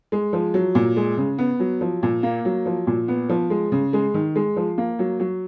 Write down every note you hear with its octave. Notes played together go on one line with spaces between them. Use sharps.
G#3
F3
F#3
A#2
G#3
C#3
B3
F#3
F3
A#2
A#3
F#3
F3
A#2
B3
F3
G#3
C#3
G#3
D#3
G#3
F3
A#3
F#3
F#3